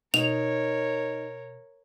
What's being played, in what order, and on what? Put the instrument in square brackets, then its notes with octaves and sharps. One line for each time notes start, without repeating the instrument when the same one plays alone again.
[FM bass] B2 [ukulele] D#4 [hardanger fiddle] A#4 C#5 [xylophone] F7